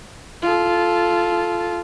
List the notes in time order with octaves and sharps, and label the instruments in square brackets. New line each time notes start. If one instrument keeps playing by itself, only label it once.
[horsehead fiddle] F4 A4